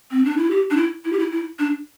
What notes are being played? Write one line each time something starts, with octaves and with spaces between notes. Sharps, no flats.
C4
D4
E4
G4
D4
E4
E4
G4
E4
E4
D4